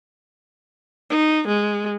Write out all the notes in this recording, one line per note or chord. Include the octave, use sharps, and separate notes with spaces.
D#4
G#3